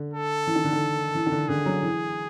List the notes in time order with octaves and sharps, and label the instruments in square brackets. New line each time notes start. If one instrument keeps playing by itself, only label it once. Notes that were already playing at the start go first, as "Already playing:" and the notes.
Already playing: [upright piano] D3
[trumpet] A4
[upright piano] E3
D#3
D3
D#3
E3
D#3
D3
[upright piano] D3 [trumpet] G#4
[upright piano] F#3
E3